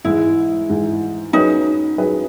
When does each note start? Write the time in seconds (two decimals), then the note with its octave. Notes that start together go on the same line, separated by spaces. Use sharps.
0.04 G#2 E3 G#3 E4
0.70 G#2 E3 G#3
1.33 F#3 C#4 D#4 G#4 B4
1.97 F#3 C#4 G#4 B4